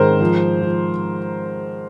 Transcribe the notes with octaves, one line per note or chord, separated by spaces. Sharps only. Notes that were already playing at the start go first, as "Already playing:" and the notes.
Already playing: G#2 D#3 A#4 C5
F3
F3